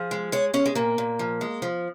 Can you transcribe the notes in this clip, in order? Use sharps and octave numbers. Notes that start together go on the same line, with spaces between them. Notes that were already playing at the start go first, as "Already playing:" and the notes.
Already playing: F3 G#4
G#3
G#3 C#5
G#3 C#4
G#3
A#2 A#3
A#2
F3
G#3
F3